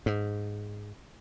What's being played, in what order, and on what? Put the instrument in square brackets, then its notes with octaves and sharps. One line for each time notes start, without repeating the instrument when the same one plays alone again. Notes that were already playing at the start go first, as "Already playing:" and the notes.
[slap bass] G#2